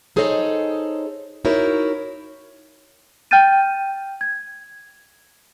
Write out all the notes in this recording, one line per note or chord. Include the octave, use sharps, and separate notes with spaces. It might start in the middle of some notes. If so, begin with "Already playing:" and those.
D#4 G#4 A4 C5 C#5 D#5
D#4 E4 F#4 A#4 C#5
G5 F6 G6 A6 D#7
G#6